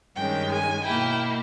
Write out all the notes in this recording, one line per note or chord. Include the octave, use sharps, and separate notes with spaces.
G2 D#3 G#3 C#4 G5
G#5
B2 A#3 E4 G5